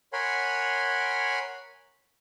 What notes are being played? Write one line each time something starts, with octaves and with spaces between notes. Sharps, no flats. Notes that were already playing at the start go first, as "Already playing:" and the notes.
A#4 C#5 F#5 G#5 B5 C6